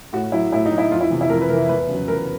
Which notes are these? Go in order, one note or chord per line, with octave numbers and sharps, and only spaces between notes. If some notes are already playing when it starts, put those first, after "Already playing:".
A2 F#4
F#3 E4
A2 E4
D#4
F#3
E4
F2 F4
E4
C3 E3
E4
F2 A#4
B4
C3 E3 A#4
E2 B4
C#3 F#3
E2 A#4